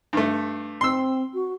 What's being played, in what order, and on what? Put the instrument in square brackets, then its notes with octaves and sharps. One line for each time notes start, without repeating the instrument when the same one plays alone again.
[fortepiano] G2 A3
[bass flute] C4 [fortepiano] C6 E6
[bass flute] F#4